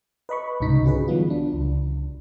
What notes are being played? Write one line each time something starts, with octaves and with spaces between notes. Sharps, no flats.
B4 D#5 B5 C#6
C2 G#2 C#3 D#4 B6
D3 C#4 F#4 G#4 B4
E3 F#3 G3 B3 F4
D4
C#2